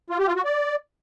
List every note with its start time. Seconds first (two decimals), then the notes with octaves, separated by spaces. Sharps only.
0.10 F4
0.19 G4
0.27 F4
0.36 F#4
0.45 D5